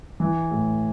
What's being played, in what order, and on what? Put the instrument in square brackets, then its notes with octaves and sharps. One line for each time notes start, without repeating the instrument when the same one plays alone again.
[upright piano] E3
A2